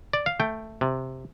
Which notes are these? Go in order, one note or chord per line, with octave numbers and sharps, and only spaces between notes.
D5
F5
A3 G5
C3